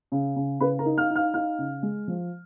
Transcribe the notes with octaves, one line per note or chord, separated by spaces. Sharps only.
C#3
C#3
C#3 B4 B5
A#4 A#5
D#4
F5 F6
D#4
F5 F6
D#4 F5 F6
C#3
G#3
F3